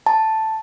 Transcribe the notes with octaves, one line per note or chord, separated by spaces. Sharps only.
A5